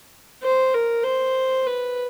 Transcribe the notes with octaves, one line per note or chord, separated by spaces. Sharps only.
C5
A#4
C5
B4